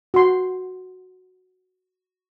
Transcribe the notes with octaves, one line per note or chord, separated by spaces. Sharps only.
F#4 C6